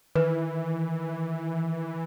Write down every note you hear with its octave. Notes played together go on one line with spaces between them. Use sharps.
D#3 E3 B4